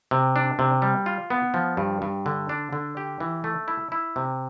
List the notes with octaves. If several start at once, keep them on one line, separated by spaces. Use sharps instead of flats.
C3
D4
C3
G3
F4
B3
F3
G2
G2
D3
D4
D3
G4
E3
A3
E4
E4
C3